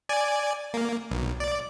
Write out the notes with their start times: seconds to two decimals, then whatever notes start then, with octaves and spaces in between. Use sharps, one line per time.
0.09 D5 G#5
0.74 A#3
1.11 B1
1.40 D5